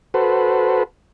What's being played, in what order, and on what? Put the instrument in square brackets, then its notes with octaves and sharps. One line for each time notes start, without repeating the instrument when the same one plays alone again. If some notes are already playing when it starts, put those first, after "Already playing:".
[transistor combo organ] F#4 A4 B4 C5